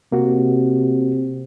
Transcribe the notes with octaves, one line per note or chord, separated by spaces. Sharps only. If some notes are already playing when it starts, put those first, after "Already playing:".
C3 A#3 F#4